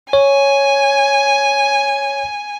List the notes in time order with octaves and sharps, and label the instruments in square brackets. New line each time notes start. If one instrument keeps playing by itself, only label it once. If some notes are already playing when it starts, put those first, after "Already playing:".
[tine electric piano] C#5 [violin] G#5